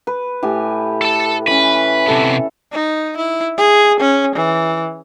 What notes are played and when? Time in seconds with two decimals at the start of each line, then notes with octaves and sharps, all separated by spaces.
0.07 B4
0.43 A2 G4 G#5
1.02 A4 A5
1.47 E3 C#4 B4
2.07 C3 B3 A4
2.72 D#4
3.17 E4
3.58 G#4
4.00 C#4
4.36 E3